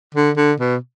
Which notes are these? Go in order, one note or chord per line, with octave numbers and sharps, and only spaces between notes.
D3
D3
B2